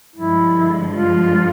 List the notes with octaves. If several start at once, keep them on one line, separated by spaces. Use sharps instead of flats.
G2 D3 F3 G#3 E4
F4